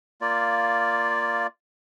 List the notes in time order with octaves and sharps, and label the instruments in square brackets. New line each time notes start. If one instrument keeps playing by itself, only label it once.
[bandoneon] A#3 F4 D5